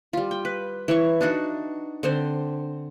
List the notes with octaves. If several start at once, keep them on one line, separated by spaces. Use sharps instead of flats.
G3 F4
G5
B4
E3 C#5 C#6
D4 D#4 F#4
D3 C4 C5